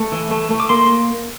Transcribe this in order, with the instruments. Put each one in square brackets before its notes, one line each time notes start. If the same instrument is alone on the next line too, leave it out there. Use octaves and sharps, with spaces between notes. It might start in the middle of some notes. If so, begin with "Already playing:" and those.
Already playing: [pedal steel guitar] A3
E3
A3
A3
D6
A#3 C6